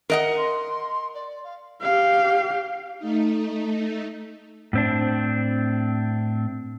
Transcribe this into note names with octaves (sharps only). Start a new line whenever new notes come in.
A#4 D#5 F#5
C6
D5
F5
G4 F5
A3 D#4
A2 C4 D4